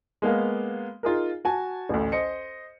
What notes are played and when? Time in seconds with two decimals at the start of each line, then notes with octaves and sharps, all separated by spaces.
0.22 G#3 A#3 B3 F5
1.03 D#4 F4 G#4 A#4
1.45 F#4 G#5 A5
1.89 A1 D2
2.12 C5 D#5 C#7